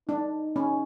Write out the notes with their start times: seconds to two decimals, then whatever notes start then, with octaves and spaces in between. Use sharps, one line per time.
0.09 D4 D#4
0.56 C#4